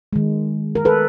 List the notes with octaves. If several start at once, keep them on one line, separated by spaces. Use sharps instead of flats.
D#3 G#3
A#4
A4 B4